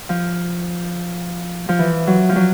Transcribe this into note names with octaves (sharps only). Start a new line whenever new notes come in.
F3
F3
E3
F#3
F3
F#3